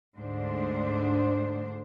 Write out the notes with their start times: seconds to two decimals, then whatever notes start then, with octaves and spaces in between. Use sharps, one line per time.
0.19 D2 G#2 D4 C5